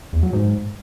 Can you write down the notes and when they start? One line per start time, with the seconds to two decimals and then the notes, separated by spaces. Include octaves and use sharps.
0.13 E2
0.23 F#3
0.33 G#2